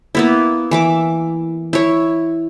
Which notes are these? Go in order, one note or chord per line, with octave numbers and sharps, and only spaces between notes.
A#3 B3 E4
E3 E5 D6
E4 C#5